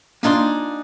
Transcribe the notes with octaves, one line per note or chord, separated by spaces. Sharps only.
A#3 D4 D#4 F4 G#5 C6